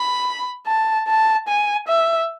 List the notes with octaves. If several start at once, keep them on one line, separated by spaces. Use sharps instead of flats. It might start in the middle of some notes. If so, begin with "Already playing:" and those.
Already playing: B5
A5
A5
G#5
E5